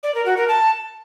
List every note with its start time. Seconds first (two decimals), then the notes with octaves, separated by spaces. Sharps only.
0.03 D5
0.14 A#4
0.26 F#4
0.37 A#4
0.48 A5